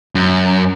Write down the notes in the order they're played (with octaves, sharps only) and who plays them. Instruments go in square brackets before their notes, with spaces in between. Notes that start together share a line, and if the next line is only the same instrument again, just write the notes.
[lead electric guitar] F#2